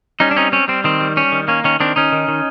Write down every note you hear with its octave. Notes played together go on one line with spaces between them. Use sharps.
G3 C#4 D#4
D4
C4 C#4 D#4
C4 C#4
G3 C4
D#3 C4
G3
G3 C#4
D#3
A#3 C#4
D#3 C#4
D#3 C4 D4
D#3 C#4 D#4
D#3
D#3